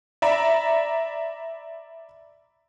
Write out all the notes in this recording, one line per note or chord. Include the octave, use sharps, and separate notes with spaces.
D5 E5 A#5 B5